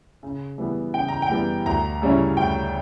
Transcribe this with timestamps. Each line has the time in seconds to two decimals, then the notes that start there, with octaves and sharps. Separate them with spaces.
0.23 C#3
0.58 E3 G3 B3
0.94 C#3 G5
1.08 A#5
1.22 G5
1.30 E3 G3 B3
1.66 D2 A#5
2.02 C#3 G3 C#4 E4
2.37 D2 G5